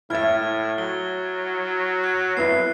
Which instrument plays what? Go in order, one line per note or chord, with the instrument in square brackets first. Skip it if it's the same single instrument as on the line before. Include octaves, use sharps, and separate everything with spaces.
[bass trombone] A2 [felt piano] E4 E5 [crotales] F6 G#6 A6
[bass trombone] F#3 [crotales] G7
[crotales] F#6
[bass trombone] C2 [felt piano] B3 E4 [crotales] C7